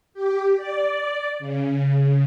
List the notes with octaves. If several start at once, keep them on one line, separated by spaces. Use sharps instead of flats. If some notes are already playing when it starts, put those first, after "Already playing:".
G4
D5
C#3